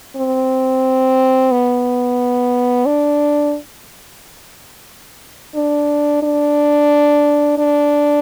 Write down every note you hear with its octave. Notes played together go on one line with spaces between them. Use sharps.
C4
B3
D4
D4
D4
D4